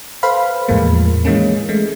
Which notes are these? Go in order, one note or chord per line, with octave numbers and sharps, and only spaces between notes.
A4 B4 C5 F5 B5
E2 A2 F3 G#3 A#3
D#3 E3 G#3 A#3 C#4
G#3 A3